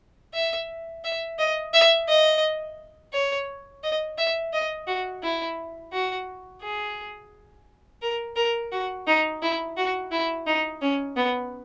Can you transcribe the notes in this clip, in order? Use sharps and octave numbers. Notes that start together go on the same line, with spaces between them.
E5
E5
D#5
E5
D#5
C#5
D#5
E5
D#5
F#4
E4
F#4
G#4
A#4
A#4
F#4
D#4
E4
F#4
E4
D#4
C#4
B3